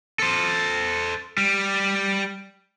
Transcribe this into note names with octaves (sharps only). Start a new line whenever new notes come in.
A4 C5
G3